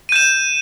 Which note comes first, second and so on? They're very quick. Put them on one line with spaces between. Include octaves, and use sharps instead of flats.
D#7 G6 E7